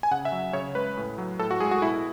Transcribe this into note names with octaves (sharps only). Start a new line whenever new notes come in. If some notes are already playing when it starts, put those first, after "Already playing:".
G#5
C#3 F#5
E5
F#3
C#3 C#5
G#3 B4
A2
F#3
A2 A4
F#4
G#3 G#4
F#4
B2 E4